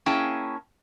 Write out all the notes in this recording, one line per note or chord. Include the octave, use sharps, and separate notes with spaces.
A#3 C#4 E4 G#4 G5 A5